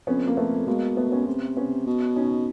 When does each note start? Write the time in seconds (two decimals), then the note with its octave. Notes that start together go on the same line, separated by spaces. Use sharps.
0.07 F2 B3 C#4
0.28 A#3
0.37 A3 B3
0.67 B2 G#3 A#3
0.97 A3 B3
1.12 B3 C#4
1.27 C3
1.57 B3 C#4
1.87 B2
2.16 C#4 D#4